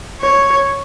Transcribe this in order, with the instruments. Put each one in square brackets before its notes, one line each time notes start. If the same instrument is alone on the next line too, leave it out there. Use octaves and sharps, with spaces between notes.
[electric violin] C#5